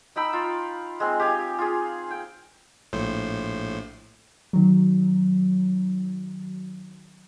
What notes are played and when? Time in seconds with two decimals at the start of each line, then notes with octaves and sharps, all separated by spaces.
0.16 D#4 G5 B5 E6
0.33 F4
1.00 G#3 C4
1.19 G4 D#5 F5 G#5
1.59 F4 G#4
2.11 G5
2.93 A#1 A2 C5
4.53 D#3 F#3